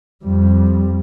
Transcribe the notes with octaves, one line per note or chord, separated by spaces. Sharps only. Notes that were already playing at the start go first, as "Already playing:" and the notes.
F2 G3